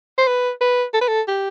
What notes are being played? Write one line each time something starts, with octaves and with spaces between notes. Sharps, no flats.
C5
B4
B4
A4
B4
A4
G4